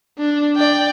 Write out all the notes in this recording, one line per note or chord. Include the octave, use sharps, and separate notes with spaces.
D4
D5 G5